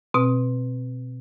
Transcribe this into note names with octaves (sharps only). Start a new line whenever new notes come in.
B2 C4